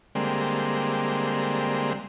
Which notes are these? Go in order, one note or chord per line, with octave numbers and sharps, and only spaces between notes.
D3 G3 G#3 A#3 C4